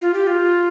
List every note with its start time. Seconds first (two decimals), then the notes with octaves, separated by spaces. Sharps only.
0.02 F4
0.14 G4
0.27 F4